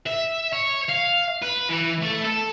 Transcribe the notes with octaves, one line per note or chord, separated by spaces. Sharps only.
E5
C#5
F5
B4
E3
A3
A4